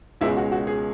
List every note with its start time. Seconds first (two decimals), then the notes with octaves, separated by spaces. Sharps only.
0.21 C#2 B2 G#3 C#4 E4
0.36 F#4
0.52 F#4
0.67 G#4